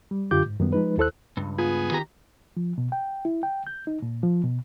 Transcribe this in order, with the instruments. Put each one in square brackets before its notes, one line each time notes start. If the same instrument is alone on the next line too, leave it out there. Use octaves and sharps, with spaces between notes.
[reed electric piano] G3
F#2 D3 F4 G4 D6 G6
G#2
F#2 D#3 G3 B3
F3 G#3 D#4 B4
D#2 E4 A4 C5 E6 F#6
[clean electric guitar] C#2 G2
[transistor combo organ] B3 G#4 [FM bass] F4
[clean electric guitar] D#3 G4 A#5
[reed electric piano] F3
B2
G5
E4
G5
G6
D#4
A#2
F3
B2